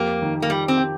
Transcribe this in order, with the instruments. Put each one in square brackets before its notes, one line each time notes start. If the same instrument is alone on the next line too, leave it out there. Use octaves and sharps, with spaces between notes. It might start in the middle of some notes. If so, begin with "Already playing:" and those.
Already playing: [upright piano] F2 G4 [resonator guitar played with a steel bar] A#3
[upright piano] D#3
[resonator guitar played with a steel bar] A#3
[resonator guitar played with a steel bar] G3 [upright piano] G4
[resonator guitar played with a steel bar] C4
[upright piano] G4